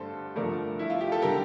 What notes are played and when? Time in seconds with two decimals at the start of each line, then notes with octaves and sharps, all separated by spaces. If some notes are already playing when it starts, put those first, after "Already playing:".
Already playing: G2 D3 A3 A4 C5
0.36 G2 D3 F3 A3 A#4 D5
0.79 E4
0.90 F4
1.01 G4
1.12 A4
1.22 D3 G3 G4 A#4